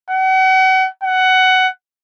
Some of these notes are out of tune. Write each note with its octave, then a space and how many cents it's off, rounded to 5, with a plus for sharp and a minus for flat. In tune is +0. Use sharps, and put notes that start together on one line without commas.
F#5 +35
F#5 +15